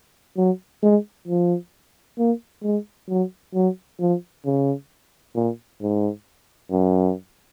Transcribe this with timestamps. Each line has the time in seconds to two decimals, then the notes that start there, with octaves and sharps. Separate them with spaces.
0.37 F#3
0.83 G#3
1.28 F3
2.18 A#3
2.63 G#3
3.09 F#3
3.55 F#3
4.00 F3
4.45 C#3
5.35 A#2
5.82 G#2
6.71 F#2